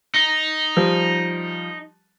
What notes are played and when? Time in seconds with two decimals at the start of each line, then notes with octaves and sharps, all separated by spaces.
0.14 D#4
0.76 F3 G3